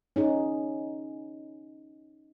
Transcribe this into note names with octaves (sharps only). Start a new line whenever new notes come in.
C#4 D#4 G#4